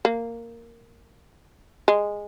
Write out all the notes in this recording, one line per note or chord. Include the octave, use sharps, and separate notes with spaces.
A#3
G#3